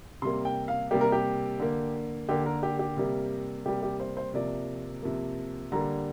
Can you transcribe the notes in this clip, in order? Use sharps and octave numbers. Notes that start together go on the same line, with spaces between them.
C3 G3 A#3 C6
G5
F5
C3 G3 A#3 G4
A#4
G4
D3 A#3
D3 A#3 G4
A#4
G4
G4
C3 G3 A#3
C3 G3 A#3 G4
G4
C5
C5
C3 F3 A#3 D5
C3 F3 A#3
D3 G3 A#3 A#5